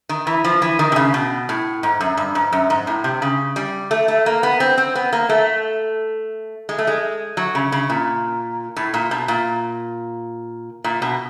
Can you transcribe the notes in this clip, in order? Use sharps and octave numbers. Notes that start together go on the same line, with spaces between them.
D#3
E3
F3
E3
D#3
C3
C#3
B2
A2
G#2
F#2
G2
G#2
F#2
G#2
A2
C3
C#3
G3
A3
A3
A#3
B3
C4
C4
B3
A#3
A3
G#3
A3
G#3
F#3
C#3
C#3
A#2
A2
A#2
B2
A#2
A#2
B2